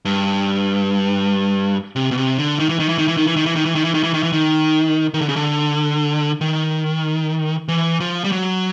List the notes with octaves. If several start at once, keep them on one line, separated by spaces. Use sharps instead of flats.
G2
C3
B2
C3
D3
D#3
E3
D#3
E3
D#3
E3
D#3
E3
D#3
E3
D#3
E3
D#3
E3
D#3
E3
D#3
E3
D#3
D#3
D3
C#3
D3
D#3
E3
F3
G3
F#3